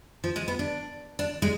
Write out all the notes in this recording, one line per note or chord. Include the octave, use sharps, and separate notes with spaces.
F3
G#3
B3
D4
D4
G#3